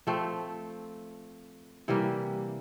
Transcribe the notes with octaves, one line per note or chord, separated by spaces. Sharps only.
F3 A3 C4
C3 E3 G3 A#3